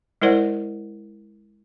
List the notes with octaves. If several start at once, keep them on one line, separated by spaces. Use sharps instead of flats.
G#3 E4 A#4 C5 D5 F#5